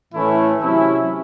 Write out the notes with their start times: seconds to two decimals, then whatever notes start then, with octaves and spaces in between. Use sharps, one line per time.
0.13 A2 E3 A3 C#4 E4
0.61 C3 F#3 C#4 E4